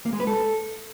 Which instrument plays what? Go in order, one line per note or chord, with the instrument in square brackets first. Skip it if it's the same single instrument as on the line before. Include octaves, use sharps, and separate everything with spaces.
[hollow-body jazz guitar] A#3
G#3
B4
A4